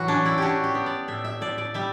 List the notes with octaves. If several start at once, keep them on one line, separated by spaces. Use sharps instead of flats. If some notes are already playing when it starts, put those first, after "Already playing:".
Already playing: A2 E3 F#3 F#4
C#4 D4
E4
D4 F#4 G4
G4
B3
D5
A2 E5
E5
A2 D5
D5
G3 E5